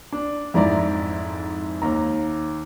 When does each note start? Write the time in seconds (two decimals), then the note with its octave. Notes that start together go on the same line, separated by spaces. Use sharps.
0.13 D4
0.54 F2 G#2 E4 D5 A#5
1.82 D#2 A#5